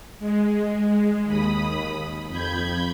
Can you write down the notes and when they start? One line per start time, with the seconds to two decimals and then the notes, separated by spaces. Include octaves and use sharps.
0.19 G#3
1.25 D#2 B5 D#6
2.28 F2 B5 G6 G#6